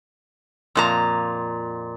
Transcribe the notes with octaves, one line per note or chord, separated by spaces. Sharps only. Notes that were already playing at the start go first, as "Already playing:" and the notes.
F2 A#2 A#5